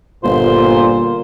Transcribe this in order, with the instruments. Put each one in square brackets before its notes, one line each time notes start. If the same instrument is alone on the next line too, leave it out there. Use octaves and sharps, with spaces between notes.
[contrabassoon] G1 [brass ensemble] A#2 [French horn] F4 [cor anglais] C5